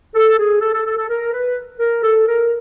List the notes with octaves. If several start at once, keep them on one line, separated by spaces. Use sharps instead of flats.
A4
G#4
A4
A4
A4
A4
A#4
B4
A#4
A4
A#4